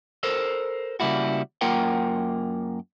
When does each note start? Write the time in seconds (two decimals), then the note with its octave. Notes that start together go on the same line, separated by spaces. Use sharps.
0.23 A4 A#4 C5
1.00 C#3 G3 A#3 E4 F#4
1.61 F#2 A#3 F4 A#4 F#5 G5